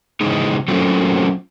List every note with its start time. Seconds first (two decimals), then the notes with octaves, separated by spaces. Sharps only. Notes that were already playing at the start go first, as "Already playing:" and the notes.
0.21 C#3 E3 G#3 D#4
0.68 F#3 A3 A#3 C4 C#4 F4